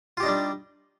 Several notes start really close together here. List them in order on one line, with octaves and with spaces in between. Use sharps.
F4 G4 D#4 D4 G3